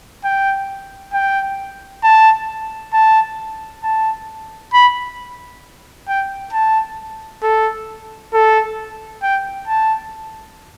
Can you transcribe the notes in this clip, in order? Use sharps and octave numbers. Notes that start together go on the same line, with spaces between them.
G5
G5
A5
A5
A5
B5
G5
A5
A4
A4
G5
A5